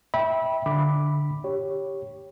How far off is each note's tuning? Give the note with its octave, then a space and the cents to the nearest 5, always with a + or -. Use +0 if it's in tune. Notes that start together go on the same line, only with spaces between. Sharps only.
E5 -20 G5 +0 B5 -20
D3 +0 B5 +0 D6 +0
G4 +0 C#5 +0